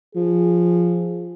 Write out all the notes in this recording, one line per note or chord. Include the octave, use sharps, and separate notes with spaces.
F3 G#4